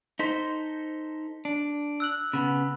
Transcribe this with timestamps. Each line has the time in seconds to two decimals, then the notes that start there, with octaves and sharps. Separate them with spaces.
0.19 D#4 A4 C5 B6 G7
1.45 D4
2.00 E6 F#6 F#7
2.33 C#3 B3 B5